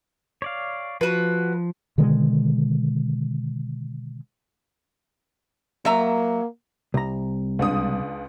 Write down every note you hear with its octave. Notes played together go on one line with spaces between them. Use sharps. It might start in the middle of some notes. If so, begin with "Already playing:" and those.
C#5 D5 F5
F3 F#4 B4
B2 D3 D#3 G#3
F#3 A#3 E5 A#5
C2 A#5
C#2 D4 D#6